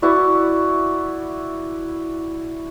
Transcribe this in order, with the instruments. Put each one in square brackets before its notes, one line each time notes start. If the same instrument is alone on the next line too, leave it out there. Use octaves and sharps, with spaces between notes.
[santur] E4 F#4 B4 D5